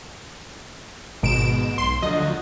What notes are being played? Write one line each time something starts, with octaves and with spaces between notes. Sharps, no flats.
G#1 G#2 B2 D7 E7
B1 C6
D2 D3 F3 F#3 D#5